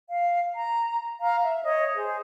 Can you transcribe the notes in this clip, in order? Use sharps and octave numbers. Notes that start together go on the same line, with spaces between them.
F5
A#5
F5 A#5
E5
C#5 D#5
G#4 C5